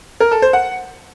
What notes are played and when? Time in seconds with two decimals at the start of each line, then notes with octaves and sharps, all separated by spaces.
0.20 A#4
0.31 A4
0.42 C5
0.53 F#5